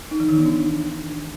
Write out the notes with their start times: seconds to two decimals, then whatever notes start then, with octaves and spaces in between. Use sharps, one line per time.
0.11 D#4
0.20 E3
0.29 D#3
0.37 B3
0.46 D4